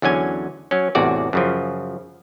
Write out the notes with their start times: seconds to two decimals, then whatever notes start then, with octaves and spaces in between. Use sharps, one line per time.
0.02 E2 D3 F#3 C#4 G#5
0.71 F#3 C#4
0.95 A1 E2 C3 F#4 D5
1.33 F#2 C#3 F3